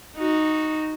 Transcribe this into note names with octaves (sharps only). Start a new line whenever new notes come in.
D#4 F#4